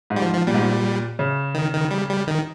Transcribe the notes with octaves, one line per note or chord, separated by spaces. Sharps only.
G#2
G3
F3
F3
A#2 G3
G#2
A#2
C#3
D#3
D#3
G3
G3
D#3